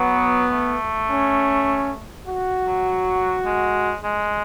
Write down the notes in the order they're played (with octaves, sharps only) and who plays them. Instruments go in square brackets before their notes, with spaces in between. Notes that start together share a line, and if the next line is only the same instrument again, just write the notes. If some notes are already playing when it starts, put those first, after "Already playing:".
Already playing: [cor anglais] F#3 [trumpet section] B3
[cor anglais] A3
[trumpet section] C#4
F#4
[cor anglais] F#3
G#3
G#3